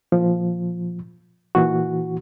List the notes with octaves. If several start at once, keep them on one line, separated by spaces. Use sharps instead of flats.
A#2 F3
A#2 E3 F#4